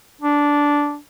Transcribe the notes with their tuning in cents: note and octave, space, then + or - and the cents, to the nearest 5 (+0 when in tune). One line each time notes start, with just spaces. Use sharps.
D4 -10